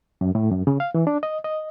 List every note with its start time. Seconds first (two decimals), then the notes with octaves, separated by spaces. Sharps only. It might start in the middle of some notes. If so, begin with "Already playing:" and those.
0.21 F#2
0.35 A2
0.51 F#2
0.67 C#3
0.80 F5
0.94 E3
1.07 D4
1.23 D#5
1.44 D#5